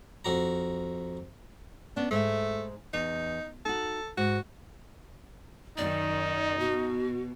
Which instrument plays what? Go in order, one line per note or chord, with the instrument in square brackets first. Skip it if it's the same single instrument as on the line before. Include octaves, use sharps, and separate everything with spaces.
[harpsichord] F2 F#4 A#5
[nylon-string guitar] B3 C#4 [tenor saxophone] D4
[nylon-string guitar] G#2 G#3 E5 [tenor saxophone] A3
[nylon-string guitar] E2 [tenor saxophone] D#4
[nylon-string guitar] D#4 F#4 [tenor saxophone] A4
[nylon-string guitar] G#2 [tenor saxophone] F#4
[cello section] F#2 D#3 [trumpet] D#4 [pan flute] D5
[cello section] B2 [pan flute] F#4